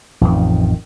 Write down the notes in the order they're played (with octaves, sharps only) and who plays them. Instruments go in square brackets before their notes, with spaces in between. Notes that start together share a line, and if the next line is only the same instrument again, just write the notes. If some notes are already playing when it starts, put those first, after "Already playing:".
[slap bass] A1 F2 D#3